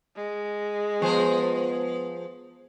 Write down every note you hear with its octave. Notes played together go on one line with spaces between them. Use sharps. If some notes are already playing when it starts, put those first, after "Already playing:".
G#3
F3 B3 G#4 C5